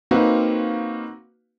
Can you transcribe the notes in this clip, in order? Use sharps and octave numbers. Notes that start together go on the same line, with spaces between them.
A#3 C4 D#4 F#4 B4 F5